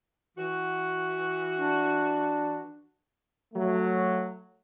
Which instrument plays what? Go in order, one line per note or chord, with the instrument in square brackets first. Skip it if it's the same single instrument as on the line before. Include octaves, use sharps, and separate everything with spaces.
[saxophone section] E3 F#4
[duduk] D4
[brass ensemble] F#3 A3